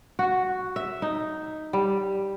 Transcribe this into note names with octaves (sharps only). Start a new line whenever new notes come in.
F#4
E5
D#4
G3